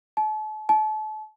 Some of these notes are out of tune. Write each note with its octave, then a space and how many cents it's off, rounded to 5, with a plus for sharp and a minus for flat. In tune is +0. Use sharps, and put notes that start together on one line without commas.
A5 -40
A5 -35